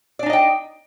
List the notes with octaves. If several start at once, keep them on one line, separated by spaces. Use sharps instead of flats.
D4 D#4 D5 D#5 G5